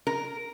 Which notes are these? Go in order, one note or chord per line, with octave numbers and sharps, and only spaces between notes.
A#4